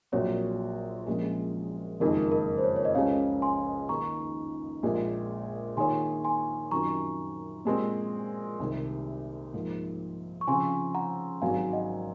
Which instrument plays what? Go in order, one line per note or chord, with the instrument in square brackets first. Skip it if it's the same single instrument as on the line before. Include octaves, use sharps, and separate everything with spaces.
[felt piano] A#1 A#2 F#3 C4 F#4 [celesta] C#5
[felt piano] A#1 A#2 F3 G#3 C#4
[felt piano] F#1 F2 D#3 G#3 D#4 [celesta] A#4
[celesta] A#4
C5
C#5
C#5
D#5
[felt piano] C#2 C#3 G#3 C#4 G#4 [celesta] C#5 F5
[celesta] G#5 C6
[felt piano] D#3 A#3 D#4 [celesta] A#5 C#6
[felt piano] A#1 A#2 G#3
[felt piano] D#3 A#3 F4 G#4 C#5 [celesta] G#5 C6
[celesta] G#5 C6
[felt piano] F#2 D#3 F#3 C4 F4 [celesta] A#5 C#6
[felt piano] A#2 G#3 C4
C2 C3 D#3
G#2 F3 A#3
[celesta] C#6
[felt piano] C#3 F3 C4 F4 [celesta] G#5 C6
[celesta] F#5 A#5
[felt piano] G#1 G#2 F#3 [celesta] F5 G#5
[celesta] D#5 F#5